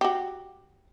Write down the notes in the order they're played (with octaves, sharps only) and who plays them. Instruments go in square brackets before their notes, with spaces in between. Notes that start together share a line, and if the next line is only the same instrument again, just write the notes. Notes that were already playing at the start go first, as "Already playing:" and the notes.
[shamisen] F#4 G4